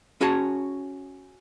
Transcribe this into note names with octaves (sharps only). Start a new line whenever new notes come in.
C#4 F#4 G#4 C#5 A5